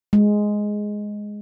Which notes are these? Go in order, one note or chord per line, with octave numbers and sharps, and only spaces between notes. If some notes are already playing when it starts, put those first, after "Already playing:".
G#3